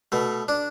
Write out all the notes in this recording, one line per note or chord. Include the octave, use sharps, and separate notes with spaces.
B2 A3
D4